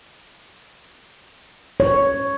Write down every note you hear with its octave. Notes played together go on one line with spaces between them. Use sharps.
C#5